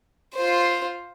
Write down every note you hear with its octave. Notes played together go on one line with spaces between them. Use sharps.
F4 C5